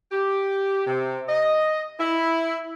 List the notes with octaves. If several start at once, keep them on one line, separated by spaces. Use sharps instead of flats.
G4
C3
D#5
E4